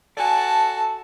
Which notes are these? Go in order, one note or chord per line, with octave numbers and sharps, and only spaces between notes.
F#4 A4 D5 G#5 A5